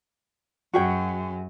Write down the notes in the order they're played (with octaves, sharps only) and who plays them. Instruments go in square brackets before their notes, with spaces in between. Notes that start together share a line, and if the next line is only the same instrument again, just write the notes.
[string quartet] F#2 [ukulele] F#4 G#4 G5